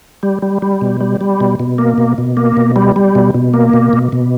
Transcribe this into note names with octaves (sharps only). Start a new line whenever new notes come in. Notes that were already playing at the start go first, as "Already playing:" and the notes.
G3
G3
G3
B2
G3
G3
B2
B2
A#3
B2
B2
A#3
B2
G3
G3
B2
B2
A#3
B2
B2
B2